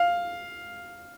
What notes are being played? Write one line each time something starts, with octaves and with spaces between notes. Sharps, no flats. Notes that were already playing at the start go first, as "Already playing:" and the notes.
Already playing: F5